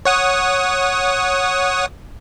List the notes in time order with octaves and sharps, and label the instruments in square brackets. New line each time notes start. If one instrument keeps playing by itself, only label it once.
[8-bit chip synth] C#5 F#5 D#6